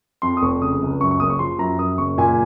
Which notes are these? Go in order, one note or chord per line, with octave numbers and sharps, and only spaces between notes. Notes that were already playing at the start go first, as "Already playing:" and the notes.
F2 C6
D#6
F1 C#6
C#3 D#6
C#2
F#2 C#6
C#6
F#1 D#6
C#6
F3 C6
F#2 A#5
F#2 D#6
F#1 C#6
A#2 G#5